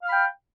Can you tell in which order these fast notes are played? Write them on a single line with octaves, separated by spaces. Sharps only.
F5 F6 B5 G5